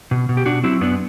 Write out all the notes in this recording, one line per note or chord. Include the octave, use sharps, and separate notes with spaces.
B2
B2
G4
B2 D4 F#4
F#3 C4 E4
F#2 B3 D4